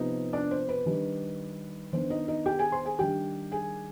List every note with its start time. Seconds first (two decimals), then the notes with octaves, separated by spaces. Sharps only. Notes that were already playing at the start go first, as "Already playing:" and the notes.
Already playing: C3 F3 B3 D#4
0.33 D4 D5
0.51 C5
0.69 B4
0.86 D#3 G3 D4
1.93 D#3 B3 D4 C5
2.10 D#4 D#5
2.28 D#4 D#5
2.46 G4 G5
2.59 G#4 G#5
2.72 C5 C6
2.85 G#4 G#5
2.99 D#3 G3 D4 G4 G5
3.52 G#4 G#5